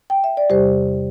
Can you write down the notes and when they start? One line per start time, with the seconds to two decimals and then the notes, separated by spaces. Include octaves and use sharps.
0.10 G5
0.24 E5
0.37 D5
0.50 E2 C3 G3 G4 C5